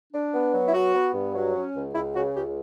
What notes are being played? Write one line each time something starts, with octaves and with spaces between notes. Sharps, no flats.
D4
B3
F#3
E4
B3 F#4
B3
G2
F#3
C#4
C#2
C#2 E4
C#3 F#4
C#2 G4